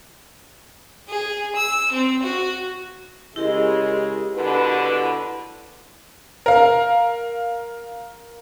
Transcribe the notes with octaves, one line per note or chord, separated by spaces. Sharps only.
G#4
E6
C4
F#4
C#3 G#3 E4 G4 A#4
B2 D3 B4
A#4 F5